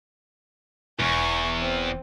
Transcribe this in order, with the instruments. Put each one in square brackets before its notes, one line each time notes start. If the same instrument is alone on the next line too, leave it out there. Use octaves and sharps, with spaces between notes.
[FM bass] E1 [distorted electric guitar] E2 [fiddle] G#5 C#6
[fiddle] C4